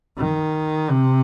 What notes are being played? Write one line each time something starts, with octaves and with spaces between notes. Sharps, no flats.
D#3
C3